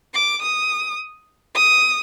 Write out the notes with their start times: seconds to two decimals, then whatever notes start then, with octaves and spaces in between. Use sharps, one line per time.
0.14 D6
0.42 D#6
1.55 D#6